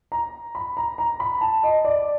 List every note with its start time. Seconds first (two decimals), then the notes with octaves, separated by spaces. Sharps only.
0.12 A#5
0.55 B5
0.77 A#5
0.98 A#5
1.20 B5
1.41 A5
1.63 D#5
1.85 D5